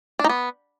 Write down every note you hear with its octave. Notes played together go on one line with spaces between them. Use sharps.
D4
D#4
B3